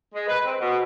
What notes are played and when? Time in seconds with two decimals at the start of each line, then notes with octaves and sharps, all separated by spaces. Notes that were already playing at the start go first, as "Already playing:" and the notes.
0.13 G#3
0.28 B4
0.45 C4
0.60 B2